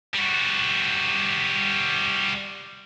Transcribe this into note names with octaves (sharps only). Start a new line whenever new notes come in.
G3 F#4